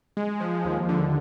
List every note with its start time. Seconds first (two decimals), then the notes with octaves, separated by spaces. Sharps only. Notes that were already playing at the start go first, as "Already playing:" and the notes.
0.17 G#3
0.40 F3
0.65 D#2
0.89 D3